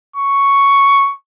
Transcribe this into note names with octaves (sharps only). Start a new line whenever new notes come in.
C#6